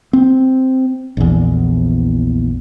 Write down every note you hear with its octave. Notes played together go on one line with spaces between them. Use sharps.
C4
A#1 E2